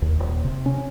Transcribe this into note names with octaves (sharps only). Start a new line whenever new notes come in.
D#2
D#1
C3
C#4